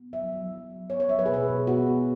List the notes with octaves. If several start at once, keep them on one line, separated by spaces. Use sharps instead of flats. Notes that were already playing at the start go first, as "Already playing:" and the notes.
Already playing: B3
F#3 E5
F#3
F#3
F#3
B3 C#5
C#5
F#3 E5
B4
B2 G#4
B4
B2
B3 F#4
B3